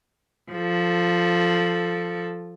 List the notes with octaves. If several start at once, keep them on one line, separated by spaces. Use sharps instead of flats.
F3 A4